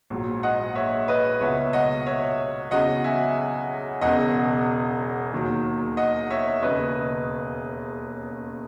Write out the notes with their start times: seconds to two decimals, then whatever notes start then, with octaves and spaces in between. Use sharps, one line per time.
0.10 A#1 G#2 F#3
0.43 D#5 F#5
0.75 C#5 E5
1.08 B4 D#5
1.41 C#2 B2 F#3 C#5 E5
1.73 D#5 F#5
2.06 C#5 E5
2.71 E2 C#3 F#3 D#5 F#5
3.04 E5 G#5
4.01 E1 E2 C#3 D#5 F#5
5.32 D#2 D#3 F#3
5.97 D#5 F#5
6.30 C#5 E5
6.63 E1 D#2 C#3 B4 D#5